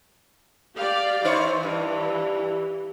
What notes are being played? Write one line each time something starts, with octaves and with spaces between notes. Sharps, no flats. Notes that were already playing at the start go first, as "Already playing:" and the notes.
G4 D5 F5
E3 D#4 C5 C#5
G2